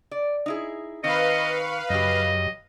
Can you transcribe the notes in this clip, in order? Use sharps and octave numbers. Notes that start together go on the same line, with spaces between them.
D5
D#4 E4 G#4
D#3 C4 B4 D#5 F5 C#6
F#2 C#3 F#3 G4 D#5